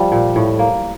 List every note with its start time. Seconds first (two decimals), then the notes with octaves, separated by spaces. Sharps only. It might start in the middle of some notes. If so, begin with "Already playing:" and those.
Already playing: F3 G3
0.12 A#2
0.36 A2
0.59 A#3